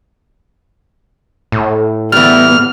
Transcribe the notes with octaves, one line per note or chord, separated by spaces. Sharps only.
A2
E3 G3 B3 F6